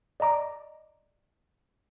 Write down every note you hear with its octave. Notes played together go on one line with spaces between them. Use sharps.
D5 D#5 A#5 D6